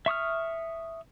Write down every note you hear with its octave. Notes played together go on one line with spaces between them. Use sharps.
E5 C#6 D#6 F6